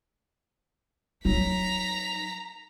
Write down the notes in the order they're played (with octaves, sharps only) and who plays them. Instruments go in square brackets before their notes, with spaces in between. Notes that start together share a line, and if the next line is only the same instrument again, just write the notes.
[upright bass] F#3 D#4 [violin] A#5 B6